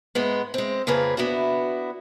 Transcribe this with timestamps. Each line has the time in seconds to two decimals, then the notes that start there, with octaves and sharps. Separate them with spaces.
0.15 G#2 G#3 B3
0.54 G#3 C4
0.87 F2 C#3 F3 A#3 G#4 B4
1.17 B3 D4 E4 F#4